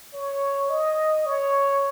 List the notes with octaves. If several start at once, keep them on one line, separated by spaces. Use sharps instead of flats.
C#5
D#5
C#5